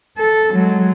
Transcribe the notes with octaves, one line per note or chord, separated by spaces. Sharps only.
A4
F#3 G#3